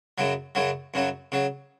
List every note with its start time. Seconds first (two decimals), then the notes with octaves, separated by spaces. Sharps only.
0.18 F#2 C#3 F#3
0.55 F#2 C#3 F#3
0.94 F#2 C#3 F#3
1.32 C#3 F#3